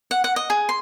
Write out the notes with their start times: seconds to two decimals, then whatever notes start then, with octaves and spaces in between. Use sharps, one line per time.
0.11 F#5
0.24 F#5
0.36 D#5
0.50 G#4
0.69 C6